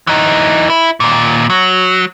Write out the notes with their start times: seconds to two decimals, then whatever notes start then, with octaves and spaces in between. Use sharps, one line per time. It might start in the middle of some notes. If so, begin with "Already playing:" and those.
0.07 E3 D#4
0.70 E4
1.00 D#2 A#2
1.50 F#3